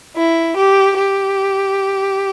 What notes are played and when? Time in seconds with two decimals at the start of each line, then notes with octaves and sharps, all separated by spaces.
0.17 E4
0.57 G4
0.99 G4